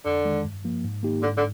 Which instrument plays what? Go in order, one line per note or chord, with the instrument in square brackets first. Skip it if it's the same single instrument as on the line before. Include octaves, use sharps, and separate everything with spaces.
[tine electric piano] F2 [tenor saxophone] D3
[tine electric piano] D#3 G#3
G2
F3 A#3
G#2
D#3 A#3 D#4 G4
[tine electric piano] G#2 [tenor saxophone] D3
[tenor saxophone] D3